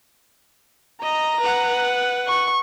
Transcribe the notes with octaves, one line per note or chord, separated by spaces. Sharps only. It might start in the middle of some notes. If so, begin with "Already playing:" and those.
D#5 A#5
B4 F#5
C#6